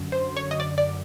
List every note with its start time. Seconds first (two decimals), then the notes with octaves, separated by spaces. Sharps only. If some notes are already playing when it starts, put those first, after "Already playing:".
Already playing: F#2 D3
0.12 C5
0.37 C#5
0.51 D#5
0.60 D5
0.78 D5